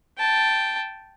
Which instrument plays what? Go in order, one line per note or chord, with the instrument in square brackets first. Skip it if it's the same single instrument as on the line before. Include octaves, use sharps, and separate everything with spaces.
[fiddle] G5 A5